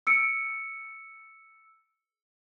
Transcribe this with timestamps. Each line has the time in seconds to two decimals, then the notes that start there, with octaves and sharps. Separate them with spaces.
0.07 E6 C#7 D7